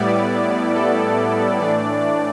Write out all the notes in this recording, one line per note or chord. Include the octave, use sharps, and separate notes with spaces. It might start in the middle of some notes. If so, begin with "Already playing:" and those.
Already playing: A2 G3 B3 E4 D5
A4
A2 E3 A3 D4 D5
D5